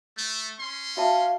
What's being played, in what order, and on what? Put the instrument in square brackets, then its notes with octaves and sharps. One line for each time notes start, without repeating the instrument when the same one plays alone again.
[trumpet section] A3
C#4 C6
[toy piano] F#4 E5 A5 [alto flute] F5